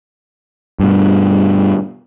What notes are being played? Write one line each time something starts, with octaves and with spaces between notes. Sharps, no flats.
G2 B2